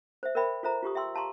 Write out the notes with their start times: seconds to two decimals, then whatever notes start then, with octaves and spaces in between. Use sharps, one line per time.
0.23 C5 E5
0.35 A#4 C5 D5 E5 G5 B5
0.63 F4 A4 C5 E5 A#5
0.83 F4 G4 C#6 D#6
0.95 E5 G5 C6 E6
1.15 F5 A5 A#5 C6 C#6